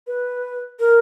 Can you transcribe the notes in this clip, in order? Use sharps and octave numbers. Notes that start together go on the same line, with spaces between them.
B4
A#4